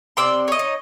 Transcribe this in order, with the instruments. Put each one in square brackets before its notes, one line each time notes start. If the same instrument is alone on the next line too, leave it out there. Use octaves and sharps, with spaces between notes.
[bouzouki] C3 C4 D5 [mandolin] C6 D6 E6
[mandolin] C#5 D#5
[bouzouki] D#4